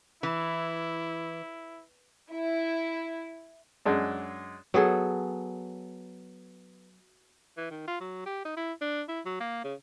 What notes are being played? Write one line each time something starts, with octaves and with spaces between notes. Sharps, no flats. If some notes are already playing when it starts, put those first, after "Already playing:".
E3 E4
E4
F#2 G#3 D4
F#3 B3 G#4 A4
E3
D#3
F4
F#3
G4
D#4
E4
D4
E4
F#3
A#3
C#3